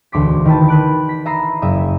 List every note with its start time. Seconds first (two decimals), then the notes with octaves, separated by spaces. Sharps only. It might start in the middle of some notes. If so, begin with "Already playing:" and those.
0.12 E1 D2 C6 D6 B6
0.45 D#3 E4 B4 G5 A5
0.68 B4 F#6 D7
1.09 B6
1.25 E5 A#5 B5 D#6 A#6 C7
1.62 F#1 E5 D#6